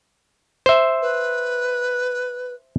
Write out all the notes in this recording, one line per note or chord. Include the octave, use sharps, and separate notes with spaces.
C5 E5
B4